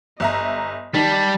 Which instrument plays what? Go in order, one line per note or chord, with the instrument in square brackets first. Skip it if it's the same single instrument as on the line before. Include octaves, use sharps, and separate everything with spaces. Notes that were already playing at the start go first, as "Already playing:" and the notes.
[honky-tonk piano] G1 E5 A#5 [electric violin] D#5
[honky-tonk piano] D#3 [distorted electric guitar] G3 [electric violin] A5 B6